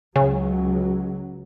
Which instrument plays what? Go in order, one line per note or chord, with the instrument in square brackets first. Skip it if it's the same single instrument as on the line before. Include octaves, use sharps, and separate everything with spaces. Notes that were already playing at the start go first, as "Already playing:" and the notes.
[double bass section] C#2 F#3 [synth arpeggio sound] C#3